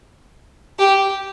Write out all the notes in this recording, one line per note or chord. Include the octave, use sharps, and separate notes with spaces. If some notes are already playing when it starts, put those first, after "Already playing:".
G4